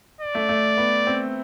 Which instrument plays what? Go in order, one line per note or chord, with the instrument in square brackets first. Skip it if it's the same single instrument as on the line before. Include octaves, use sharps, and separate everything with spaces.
[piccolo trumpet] D5
[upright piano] A3
A3
B3
C4